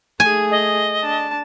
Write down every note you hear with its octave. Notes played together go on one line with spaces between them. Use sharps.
A3 G#4 G#5
D#5
D4 A5